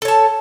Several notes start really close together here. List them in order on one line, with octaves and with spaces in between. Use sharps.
A4 C#5 A5